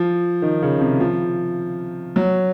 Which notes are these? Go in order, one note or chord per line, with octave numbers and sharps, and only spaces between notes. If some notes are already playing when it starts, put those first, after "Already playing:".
Already playing: F3
D#3
C#3
C3
F3
F#3